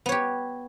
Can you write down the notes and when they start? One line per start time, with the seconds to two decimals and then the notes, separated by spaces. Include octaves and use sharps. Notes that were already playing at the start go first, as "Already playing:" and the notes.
0.06 B3
0.09 C#5
0.12 G4